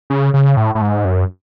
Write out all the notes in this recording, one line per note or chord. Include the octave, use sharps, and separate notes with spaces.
C#3
C#3
A2
A2
G#2
F#2